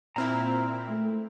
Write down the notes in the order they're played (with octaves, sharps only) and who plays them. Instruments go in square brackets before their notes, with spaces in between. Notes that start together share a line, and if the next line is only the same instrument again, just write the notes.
[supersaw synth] A#2 C4 E4 [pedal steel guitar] A#5 F6
[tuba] A3